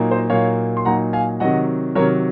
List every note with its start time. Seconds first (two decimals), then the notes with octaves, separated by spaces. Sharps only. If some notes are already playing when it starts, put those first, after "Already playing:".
Already playing: A#2 F#3 A#3 D#4
0.11 C5 D#5
0.30 A#2 F#3 A#3 D#4 C#5 F5
0.77 C6
0.85 A#2 F#3 A#3 D#4 F#5 A#5
1.13 F5 G#5
1.40 C3 D#3 F#3 D#5 F#5
1.95 C3 D#3 F#3 A#4 C#5